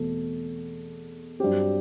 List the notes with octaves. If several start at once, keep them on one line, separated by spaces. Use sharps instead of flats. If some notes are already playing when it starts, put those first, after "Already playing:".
Already playing: E2 B2 A3 C4 A4
G2 F#3 C4 G4